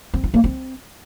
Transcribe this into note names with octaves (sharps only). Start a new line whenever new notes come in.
C4
F4
A#3
C4